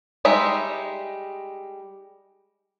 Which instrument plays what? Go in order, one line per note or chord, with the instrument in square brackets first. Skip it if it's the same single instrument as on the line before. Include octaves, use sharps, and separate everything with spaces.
[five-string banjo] G3 G#3 D#4 E5